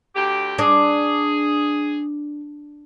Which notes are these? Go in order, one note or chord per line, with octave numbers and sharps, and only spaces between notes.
D2 G4
D4 G#4